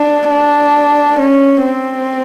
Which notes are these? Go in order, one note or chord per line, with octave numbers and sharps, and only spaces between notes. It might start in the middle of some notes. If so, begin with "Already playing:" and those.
Already playing: D4
D4
C#4
C4